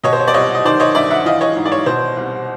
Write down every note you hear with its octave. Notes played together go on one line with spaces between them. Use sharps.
B2 C#5 D#5
C5
C#5
D5
C2 C#5 D#5
D#5
D#3 C5 D5
C#5 D#5
G2 D5 E5
E5 F#5
E3 D#5 F5
C#5 D#5
G#2
D5
C#5
B2 C5
C2